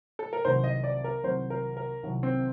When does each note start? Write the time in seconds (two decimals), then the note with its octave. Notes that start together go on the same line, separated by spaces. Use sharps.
0.19 A4
0.33 A#4
0.45 C2 C3 D#3 F#3 C5
0.64 D#5
0.84 D5
1.04 A#4
1.23 C2 C3 D#3 F#3 C5
1.50 A#4
1.77 A#4
2.03 C2 C3 D#3 F#3
2.23 C4